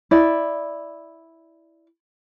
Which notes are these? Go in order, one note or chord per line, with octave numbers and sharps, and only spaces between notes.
E4 D5